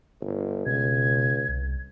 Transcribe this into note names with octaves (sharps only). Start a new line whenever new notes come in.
G1
C#2 B2 G#6
C2